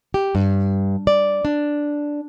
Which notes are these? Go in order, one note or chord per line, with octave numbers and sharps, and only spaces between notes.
G4
G2
D5
D4